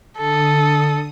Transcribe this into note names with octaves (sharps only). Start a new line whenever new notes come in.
D3 A4 D#6